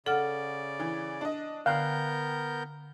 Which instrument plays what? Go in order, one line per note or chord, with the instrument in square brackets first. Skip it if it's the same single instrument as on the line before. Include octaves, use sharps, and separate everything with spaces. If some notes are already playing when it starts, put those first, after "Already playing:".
[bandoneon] C#3 D5 [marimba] A4 F#5 F6 [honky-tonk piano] F#7
[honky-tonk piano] E3
D4 D#5
[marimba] D3 [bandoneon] B3 A#4 G6 [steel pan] F5 [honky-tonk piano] G5 F#6